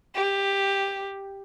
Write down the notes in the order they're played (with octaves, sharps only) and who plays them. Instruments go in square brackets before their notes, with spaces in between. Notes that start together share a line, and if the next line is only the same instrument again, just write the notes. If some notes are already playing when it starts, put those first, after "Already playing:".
[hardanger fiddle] G4